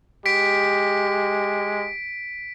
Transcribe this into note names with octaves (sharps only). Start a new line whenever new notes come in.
G#3 G4 B6 D7